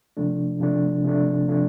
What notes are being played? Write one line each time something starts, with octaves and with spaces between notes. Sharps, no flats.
C3 F3 A3 D4
C3 F3 A3 D4
C3 F3 A3 D4
C3 F3 A3 D4